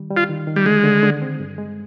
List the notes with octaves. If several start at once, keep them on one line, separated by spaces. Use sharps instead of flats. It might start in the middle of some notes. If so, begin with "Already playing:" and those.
Already playing: D#3 G3
G3
F4
D#3
D#3
G3
D3 G#3
D3
D3
C4
G2
G#3